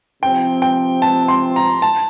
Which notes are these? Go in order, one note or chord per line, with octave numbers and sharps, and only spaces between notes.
C3 F3 C4 G5
G5
A5
C6
A#5
A5